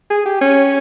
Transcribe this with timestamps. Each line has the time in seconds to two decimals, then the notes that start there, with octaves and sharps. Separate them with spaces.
0.10 G#4
0.26 G4
0.41 C#4